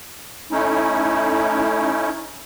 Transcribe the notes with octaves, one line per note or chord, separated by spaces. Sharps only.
A3 C#4 D#4 E4